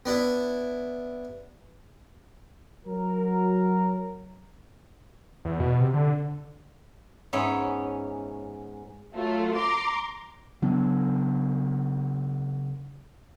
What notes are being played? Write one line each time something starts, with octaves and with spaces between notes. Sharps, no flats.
B3 D4 E4
F#3 A#4
E2
B2
C3
D3
G#2 B3 C#4 E5
F#3 A3 F4
A#5 C6 D6
C#3 F#3 B3 D4